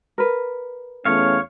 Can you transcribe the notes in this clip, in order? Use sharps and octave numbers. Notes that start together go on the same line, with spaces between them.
A#4 B4
E2 A3 C#4 C#5 F5